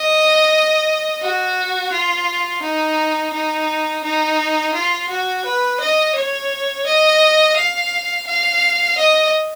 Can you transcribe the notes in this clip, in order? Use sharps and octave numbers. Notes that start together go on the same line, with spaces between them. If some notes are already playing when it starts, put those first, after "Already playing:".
Already playing: D#5
F#4
F4
D#4
D#4
D#4
F4
F#4
B4
D#5
C#5
D#5
F5
F5
D#5